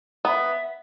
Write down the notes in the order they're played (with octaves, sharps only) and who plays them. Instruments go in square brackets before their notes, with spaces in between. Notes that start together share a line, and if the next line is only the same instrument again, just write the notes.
[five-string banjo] B3 [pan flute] E5